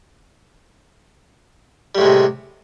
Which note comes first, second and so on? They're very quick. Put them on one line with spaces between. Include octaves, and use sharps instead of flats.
G3 A2 G#3 C3